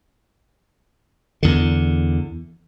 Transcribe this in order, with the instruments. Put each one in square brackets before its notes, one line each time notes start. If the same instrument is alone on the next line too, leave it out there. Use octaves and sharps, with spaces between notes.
[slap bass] E2 D3